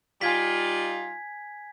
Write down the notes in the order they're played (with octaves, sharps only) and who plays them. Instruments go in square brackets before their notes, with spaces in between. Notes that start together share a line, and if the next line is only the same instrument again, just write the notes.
[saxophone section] G3 D#4 F4 [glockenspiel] G#5 G#6 B6